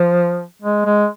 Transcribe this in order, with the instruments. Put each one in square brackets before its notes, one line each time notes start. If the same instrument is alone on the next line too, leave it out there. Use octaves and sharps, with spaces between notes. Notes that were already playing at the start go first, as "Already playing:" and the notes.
Already playing: [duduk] F3
G#3
G#3